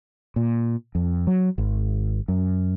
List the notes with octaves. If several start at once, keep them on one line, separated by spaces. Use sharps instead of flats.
A#2
F2
F#3
G#1
F#2